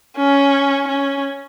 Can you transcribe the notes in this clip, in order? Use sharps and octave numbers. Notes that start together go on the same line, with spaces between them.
C#4
C#4